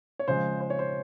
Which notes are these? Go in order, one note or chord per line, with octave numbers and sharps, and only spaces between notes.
C#5
C#3 F3 G#3 C5
C5
C#5
C5